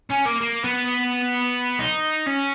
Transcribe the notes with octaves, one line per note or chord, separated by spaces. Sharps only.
C#4
A#3
A#3
B3
D#4
C#4